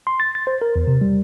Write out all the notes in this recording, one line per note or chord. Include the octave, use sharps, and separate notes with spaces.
C6
A6
A6
C5
A#4
E2
C3
G3